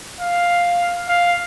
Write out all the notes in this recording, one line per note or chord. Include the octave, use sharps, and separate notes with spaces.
F5
F5